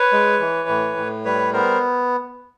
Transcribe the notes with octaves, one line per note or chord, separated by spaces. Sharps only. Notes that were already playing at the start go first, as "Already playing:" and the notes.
Already playing: B4 C#5
G#3
E3
A2
A2
G3 B4 C#5
B3 A#4 C5